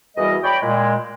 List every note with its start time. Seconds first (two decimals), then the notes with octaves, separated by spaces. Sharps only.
0.17 E2 E3 G3 F#4 A#4 D#5
0.43 C#5 D5 G5 B5
0.62 A#2 G#3